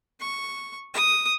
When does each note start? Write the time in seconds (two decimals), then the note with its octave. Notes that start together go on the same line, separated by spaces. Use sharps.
0.20 C#6
0.94 D#6